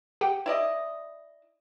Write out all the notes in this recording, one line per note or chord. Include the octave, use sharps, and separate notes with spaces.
G4 F#5 G5
E4 D5 D#5